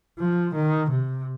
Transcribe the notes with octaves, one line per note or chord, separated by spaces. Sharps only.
F3
D#3
C3